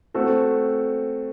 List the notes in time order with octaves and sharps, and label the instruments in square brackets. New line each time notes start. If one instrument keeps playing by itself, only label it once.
[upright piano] A3 C4 F#4 A4